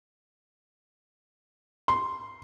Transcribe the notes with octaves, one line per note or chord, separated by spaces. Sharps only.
C6